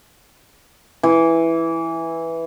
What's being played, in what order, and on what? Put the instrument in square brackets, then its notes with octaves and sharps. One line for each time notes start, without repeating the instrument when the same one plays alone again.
[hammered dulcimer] E3